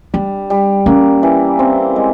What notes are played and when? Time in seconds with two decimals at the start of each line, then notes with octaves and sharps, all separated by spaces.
0.14 G3 D4
0.50 G3
0.86 A#3 C#4
1.23 E3
1.59 C4
1.96 G#3